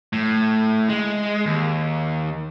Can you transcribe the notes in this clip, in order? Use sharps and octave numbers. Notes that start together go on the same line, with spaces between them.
A2
G#3
D#2